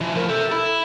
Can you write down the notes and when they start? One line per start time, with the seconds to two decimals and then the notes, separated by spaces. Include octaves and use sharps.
0.01 E3 F3
0.15 A2 F3 A#4
0.29 G4 A4 E5
0.52 E4